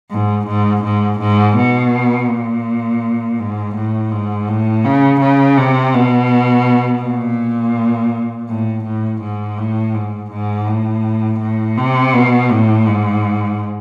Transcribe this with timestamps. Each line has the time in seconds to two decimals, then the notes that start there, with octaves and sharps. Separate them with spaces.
0.11 G#2
0.47 G#2
0.84 G#2
1.20 G#2
1.57 B2
2.29 A#2
3.39 G#2
3.75 A2
4.11 G#2
4.48 A2
4.85 C#3
5.21 C#3
5.57 C3
5.94 B2
7.03 A#2
8.49 A2
8.85 A2
9.21 G#2
9.58 A2
9.94 G#2
10.31 G#2
10.67 A2
11.40 A2
11.77 C3
12.13 B2
12.49 A2
12.86 G#2